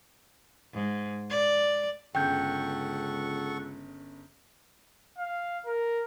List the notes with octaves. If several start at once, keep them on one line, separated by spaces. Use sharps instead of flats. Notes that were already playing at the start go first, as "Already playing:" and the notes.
G#2
D5
G1 C#2 C#3 A4 F#5 G5 C#6 G6
F5
A#4